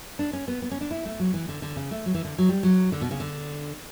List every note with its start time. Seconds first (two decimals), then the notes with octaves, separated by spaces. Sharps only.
0.19 D4
0.33 C#4
0.48 B3
0.62 B3
0.71 C#4
0.81 D4
0.91 E4
1.05 A3
1.20 F#3
1.34 E3
1.48 D3
1.62 D3
1.76 C#3
1.91 A3
2.06 F#3
2.14 E3
2.24 D3
2.38 F#3
2.49 G3
2.63 F#3
2.92 D3
3.01 B2
3.11 C#3
3.20 D3